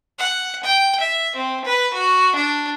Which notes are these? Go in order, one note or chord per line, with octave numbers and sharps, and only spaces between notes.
F#5
G5
E5
C4
B4
F#4
D4